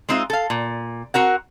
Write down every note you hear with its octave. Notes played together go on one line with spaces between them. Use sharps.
G#3 C4 D#4 F4 E5
A4 F5
A#2
C4 F#4 A#4 F#5